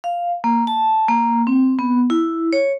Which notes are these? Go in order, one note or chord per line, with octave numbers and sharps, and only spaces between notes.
F5
A#3
A5
A#3
C4
B3
E4
C#5